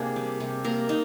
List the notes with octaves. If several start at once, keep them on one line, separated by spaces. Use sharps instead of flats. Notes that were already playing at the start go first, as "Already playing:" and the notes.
Already playing: C3 A#3 D4 G#4
G3
C3
A#3 A#4
D#4